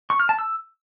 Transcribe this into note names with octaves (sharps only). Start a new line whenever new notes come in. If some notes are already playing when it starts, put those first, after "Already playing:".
C#6
F6
A5
E6